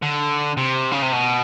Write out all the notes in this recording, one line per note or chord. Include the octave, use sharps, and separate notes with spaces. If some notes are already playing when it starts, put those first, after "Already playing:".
D3
C3
C#3
C3
B2